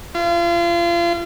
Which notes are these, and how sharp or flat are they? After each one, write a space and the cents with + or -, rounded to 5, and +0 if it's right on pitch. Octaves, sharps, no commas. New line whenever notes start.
F4 -35